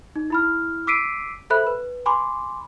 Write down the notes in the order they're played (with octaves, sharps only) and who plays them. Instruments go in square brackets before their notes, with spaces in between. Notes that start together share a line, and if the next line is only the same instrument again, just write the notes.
[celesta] D#4
E4 B5 F6
D6 E6 B6 C7 D7 D#7
A4 C5 E5 B5 F#6
B4
G#5 B5 C6 D6